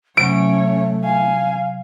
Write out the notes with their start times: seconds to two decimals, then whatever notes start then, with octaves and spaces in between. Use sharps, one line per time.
0.17 C3 F#3 A3 C#4 C#5 D7
1.04 F5 G#5